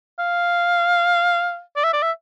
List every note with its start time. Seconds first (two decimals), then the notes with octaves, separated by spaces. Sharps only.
0.19 F5
1.76 D5
1.84 E5
1.93 D5
2.03 E5